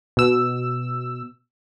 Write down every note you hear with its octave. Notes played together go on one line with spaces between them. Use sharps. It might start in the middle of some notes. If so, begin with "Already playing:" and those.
B2 E6